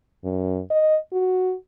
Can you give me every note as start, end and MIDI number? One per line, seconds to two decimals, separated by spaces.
0.24 0.60 42
0.70 0.97 75
1.13 1.54 66